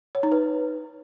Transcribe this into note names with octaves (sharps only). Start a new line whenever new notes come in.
C#5
D#4
B4